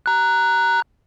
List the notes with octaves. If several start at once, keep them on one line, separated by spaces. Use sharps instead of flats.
A#5 F#6